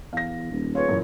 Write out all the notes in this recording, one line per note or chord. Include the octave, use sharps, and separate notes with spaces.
E2 F5 A#6
D#1
F4 G#4 B4 C#5
F#2 A#2 E3